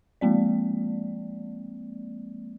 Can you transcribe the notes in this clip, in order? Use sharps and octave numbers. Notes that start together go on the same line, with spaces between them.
F3 G#3 A#3 C4 D5